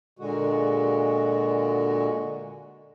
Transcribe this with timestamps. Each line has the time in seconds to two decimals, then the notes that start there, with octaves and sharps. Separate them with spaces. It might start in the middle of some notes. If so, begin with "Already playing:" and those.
0.19 A#2 D3 G#3 F#4